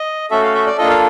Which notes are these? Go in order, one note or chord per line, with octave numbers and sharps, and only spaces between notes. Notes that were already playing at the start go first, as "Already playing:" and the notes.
Already playing: D#5
A3 C#4 F#4 A4 E5
F5
E5
D5
A#3 D4 F4 A4 D#5
F5